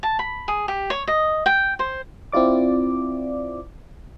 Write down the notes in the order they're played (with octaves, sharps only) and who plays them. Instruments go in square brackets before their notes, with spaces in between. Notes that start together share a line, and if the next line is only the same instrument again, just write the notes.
[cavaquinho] A5
B5
G#4
G4
C#5
D#5
G5
C5
[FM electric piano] C4 E4 F4 D5 D6